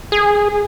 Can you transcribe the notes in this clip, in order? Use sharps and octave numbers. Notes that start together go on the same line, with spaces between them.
G#4